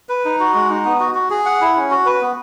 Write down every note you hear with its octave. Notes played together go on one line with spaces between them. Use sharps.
B4
D#4
F#4
G#3
D#4
B3
F#4
F#4
G#4
F#5
E4
C#4
F#4
B4
B3